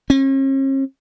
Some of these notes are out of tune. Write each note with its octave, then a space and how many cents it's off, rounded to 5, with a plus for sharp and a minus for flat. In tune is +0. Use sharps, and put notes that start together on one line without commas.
C#4 -45